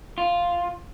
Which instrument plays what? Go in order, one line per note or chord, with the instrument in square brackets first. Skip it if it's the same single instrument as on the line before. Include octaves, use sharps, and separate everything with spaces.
[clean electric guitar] F4